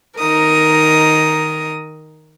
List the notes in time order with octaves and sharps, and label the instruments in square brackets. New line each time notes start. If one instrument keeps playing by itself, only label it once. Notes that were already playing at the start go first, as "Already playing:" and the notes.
[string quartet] D#3 D#4 A#4 D#6